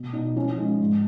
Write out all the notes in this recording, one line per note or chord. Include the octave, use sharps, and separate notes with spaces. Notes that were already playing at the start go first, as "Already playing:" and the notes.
Already playing: B2
B2 D#4
F3 C#4
C#4
G#3 D#4
G#2